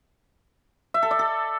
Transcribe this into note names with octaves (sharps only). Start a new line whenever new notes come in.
E5
A4
D5
A4